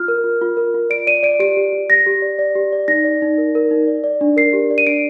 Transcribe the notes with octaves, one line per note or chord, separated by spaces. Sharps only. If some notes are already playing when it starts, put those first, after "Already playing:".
Already playing: F4 F6
A#4
F4
F4
A#4
F4
D5 D7
D5 D#7
D5 D7
G4 D7
G4
G4
G4 A#6
G4
D5
D5
G4
D5
D#4 A#6
D5
D#4
A#4
A#4
D#4
D5
D5
D4
A#4 C7
G4
D5
D#7
D4 D7